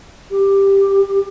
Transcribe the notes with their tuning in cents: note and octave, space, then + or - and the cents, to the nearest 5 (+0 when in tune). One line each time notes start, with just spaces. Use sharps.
G4 +5